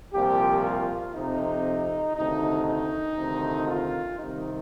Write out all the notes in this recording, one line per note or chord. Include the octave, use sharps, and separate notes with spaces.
C2 A#2 F3 G4
F4
F2 C3 F3 D#4
D2 C3 D#3 D#4
D#4
D2 C3 D#3
F4
C2 C3 D#3 D#4